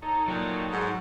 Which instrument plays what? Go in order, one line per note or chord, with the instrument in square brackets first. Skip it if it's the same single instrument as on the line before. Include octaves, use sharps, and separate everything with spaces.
[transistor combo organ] D#4 A4 C#5 [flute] A#5
[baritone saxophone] A#2 [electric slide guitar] F#3 [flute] G5
[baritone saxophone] G#2 [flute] F#5